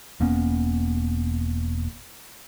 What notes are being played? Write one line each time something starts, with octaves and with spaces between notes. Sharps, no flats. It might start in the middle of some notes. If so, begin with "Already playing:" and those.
E1 A#3 B3 C#4